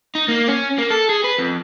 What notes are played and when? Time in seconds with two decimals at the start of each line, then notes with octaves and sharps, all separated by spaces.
0.15 D#4
0.28 A#3
0.48 C#4
0.78 A#3
0.91 A4
1.09 G#4
1.24 B4
1.38 F2